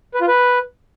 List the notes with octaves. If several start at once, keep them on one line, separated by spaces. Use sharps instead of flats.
B4
F4
B4